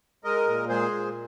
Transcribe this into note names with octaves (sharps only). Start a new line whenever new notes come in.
G#3 A#4 D#5
A#2
G#3 G#4 C5
A#2